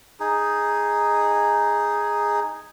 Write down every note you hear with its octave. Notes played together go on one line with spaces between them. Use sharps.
D#4 G#4